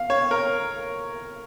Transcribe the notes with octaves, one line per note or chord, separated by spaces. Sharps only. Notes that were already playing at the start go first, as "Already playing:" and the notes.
Already playing: F5
C#5
A#4